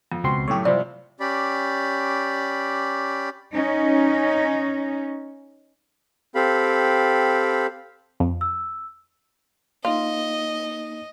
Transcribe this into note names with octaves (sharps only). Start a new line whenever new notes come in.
F2
C#2 B2 C4 C6
F#2 A2 A3 G4 C#5
C3 F3 G3 C4 E4 D5
C#4 G4 D5 B5
C#4 D#4
C4 G4 A4 F5 B5
F2
E6
A#3 D#4 F4 D#5